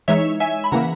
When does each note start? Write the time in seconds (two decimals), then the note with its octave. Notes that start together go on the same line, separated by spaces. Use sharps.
0.08 E3 G#3 D#4 C#5 E5
0.40 E5 G#5
0.64 B5
0.72 C#3 E3 A#3 F#5 A#5